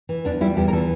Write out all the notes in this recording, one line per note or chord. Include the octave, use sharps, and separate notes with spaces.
E3
E2 D4
G3 E4
E2 G4
A#4
E3 A4